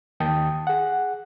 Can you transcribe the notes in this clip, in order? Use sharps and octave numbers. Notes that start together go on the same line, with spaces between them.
D#2 D#3 G5 A5 D#6
G#4 F#5